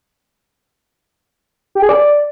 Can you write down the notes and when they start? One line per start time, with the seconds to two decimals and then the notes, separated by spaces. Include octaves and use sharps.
1.75 G4
1.82 G#4
1.89 D5